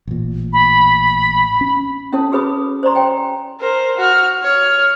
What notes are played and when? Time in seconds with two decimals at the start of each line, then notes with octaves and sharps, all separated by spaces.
0.07 A1 A#2
0.53 B5
1.61 C#4
2.13 C#4 E4 A4 C#5 A5
2.32 F#4 G#4 B4 C#5 B5 D#6
2.83 C5 D5 A#5 C6
2.95 C#5 G5 G#5
3.60 A#4 C5
3.97 F#4 F6
4.42 C#5 F6